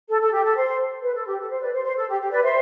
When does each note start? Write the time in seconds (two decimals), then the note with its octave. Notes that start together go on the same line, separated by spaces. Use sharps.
0.09 A4
0.21 A4
0.32 G4
0.44 A4
0.56 C5
1.03 B4
1.14 A4
1.26 G4
1.38 A4
1.50 C5
1.61 B4 D5
1.73 C5
1.84 C5
1.96 A4
2.07 G4
2.19 G4
2.31 B4 D5
2.43 C5 E5